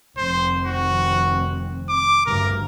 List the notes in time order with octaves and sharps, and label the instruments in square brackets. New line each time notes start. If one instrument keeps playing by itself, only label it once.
[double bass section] F1 D#3 C4 [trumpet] C5
[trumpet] F#4
D6
[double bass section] G#1 D2 G2 [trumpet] A#4